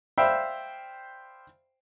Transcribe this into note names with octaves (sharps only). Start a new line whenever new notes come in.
C5 D5 E5 F5 G5 B5